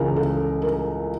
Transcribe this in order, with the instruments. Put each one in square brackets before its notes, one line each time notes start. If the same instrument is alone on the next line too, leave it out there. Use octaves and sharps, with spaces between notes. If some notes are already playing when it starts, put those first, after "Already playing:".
Already playing: [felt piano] C#2 C#3 E3 A#4
A4
A#4